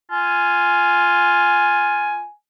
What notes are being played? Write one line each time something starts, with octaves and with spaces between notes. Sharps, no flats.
F4 G#5